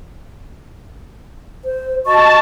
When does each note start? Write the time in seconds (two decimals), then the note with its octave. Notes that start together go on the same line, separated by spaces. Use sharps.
1.65 C5
2.06 F#4 D#5 A5 C#6